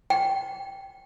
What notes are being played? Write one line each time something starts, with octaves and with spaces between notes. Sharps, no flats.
G5